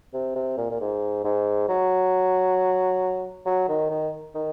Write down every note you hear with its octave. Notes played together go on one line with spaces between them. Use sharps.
C3
C3
A#2
A#2
G#2
G#2
F#3
F#3
D#3
D#3
D#3